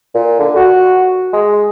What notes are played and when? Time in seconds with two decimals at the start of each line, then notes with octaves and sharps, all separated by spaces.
0.15 A#2
0.40 D3
0.56 F#4
1.33 G#3